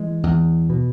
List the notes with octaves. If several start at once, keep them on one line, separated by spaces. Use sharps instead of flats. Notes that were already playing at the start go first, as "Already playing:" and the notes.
Already playing: E3 G#3
E2
B2